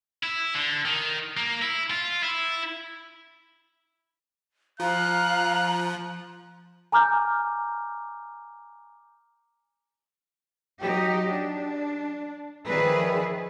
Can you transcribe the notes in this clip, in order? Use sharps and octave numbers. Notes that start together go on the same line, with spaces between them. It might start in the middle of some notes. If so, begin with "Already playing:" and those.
E4
D3
D#3
A#3
E4
F4
E4
F3 F5 A#5 F#6
G#5 A#5 D6 F6 G6
F#3 D#4 G4
D4
D#3 F3 G#4 B4 D5 E5